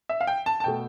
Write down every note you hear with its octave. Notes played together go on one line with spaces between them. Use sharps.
E5
F5
G5
A5
A5
B2 A3 G5